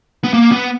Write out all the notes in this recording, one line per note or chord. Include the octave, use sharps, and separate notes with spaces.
B3
A#3
B3